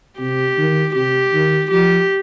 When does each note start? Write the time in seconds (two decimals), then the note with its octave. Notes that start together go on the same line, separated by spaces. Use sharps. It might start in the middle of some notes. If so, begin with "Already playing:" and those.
0.19 C3 G4
0.58 D#3
0.95 C3 G4
1.34 D#3
1.71 F3 G4